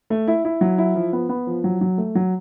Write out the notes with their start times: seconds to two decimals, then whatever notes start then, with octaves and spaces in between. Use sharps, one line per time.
0.10 A3
0.28 E4
0.45 E4
0.61 F#3
0.78 E4
0.95 F3
1.13 B3
1.29 B3
1.47 F3
1.64 F#3
1.81 F#3
1.98 A3
2.15 F#3